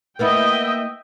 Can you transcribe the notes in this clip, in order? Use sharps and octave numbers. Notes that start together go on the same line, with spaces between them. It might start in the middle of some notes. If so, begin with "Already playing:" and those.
A#3 B3 E4 D#5 E5 G5